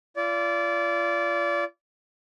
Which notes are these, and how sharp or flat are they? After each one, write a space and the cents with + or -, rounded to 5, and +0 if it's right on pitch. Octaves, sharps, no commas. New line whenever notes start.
F4 -30 D5 -25